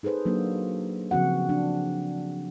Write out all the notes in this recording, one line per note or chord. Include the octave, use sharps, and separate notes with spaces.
D#4 G#4 A4 B4 C5
F#3 A#3 D4 F#4
C#3 F3 C4 F#4 F#5
D4